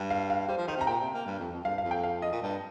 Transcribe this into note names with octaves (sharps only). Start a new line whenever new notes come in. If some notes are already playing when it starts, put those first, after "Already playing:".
Already playing: G2
F5
F5
G3 C5
F3
D#3 C5
C3 A#5
A#2 G5
C3
A#3
G2
F2
F2
G2 F5
F5
F2
G5
F5
D#5
A#2
G2